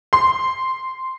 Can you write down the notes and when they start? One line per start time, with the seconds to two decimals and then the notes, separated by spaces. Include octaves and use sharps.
0.13 C6